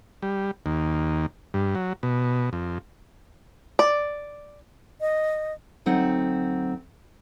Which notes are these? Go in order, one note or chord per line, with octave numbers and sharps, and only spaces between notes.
G3
D#2
G2
F#3
B2
F2
D5
D#5
D2 F#3 C4 D#4 F#5